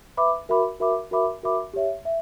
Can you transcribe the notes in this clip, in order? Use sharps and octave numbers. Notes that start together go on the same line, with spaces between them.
B4 E5 B5 D6
F#4 A#4 E5 B5 D6
F#4 A#4 E5 B5 D6
F#4 A#4 E5 B5 D6
F#4 A#4 E5 B5 D6
G4 C#5 E5
E5